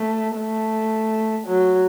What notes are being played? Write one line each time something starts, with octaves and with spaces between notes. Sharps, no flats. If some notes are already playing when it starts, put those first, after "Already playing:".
Already playing: A3
A3
F#3